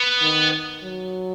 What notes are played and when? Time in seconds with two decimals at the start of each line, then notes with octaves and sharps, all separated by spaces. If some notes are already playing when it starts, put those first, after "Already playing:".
Already playing: B3
0.22 D#3
0.84 F#3